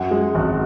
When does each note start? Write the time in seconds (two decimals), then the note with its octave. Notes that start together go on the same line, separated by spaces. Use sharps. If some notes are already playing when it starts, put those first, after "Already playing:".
Already playing: F#2 F#5
0.11 G#3
0.35 G#1